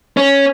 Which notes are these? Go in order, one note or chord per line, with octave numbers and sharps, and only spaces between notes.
C#4